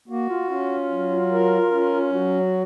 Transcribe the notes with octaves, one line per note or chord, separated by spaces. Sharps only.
A#3 F#4
F4
C#4 F4
F#3
A#4
C#4
F#3 F#4